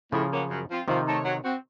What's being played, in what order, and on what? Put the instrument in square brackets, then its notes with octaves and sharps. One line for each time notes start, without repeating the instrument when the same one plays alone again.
[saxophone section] A2 [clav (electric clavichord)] C#3 F3
[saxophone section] F#3 A#3 C#4
F#2
F3 C4 F4
[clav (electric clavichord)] C3 D#3 [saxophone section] F3
[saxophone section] A3 D#4 A4 C#5
F#3
C4 F#4